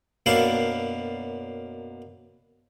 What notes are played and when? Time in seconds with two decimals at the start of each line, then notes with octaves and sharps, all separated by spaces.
0.26 F#2 B2 A#3 D4 E4 F5